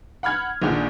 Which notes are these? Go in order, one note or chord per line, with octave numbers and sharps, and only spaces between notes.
F#5 B5 F6 G#6
A#1 A#2 D3 D#3 G#3